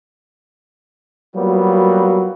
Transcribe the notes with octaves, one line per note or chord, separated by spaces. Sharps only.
F#3 G3 A#3 B3 F4 F#4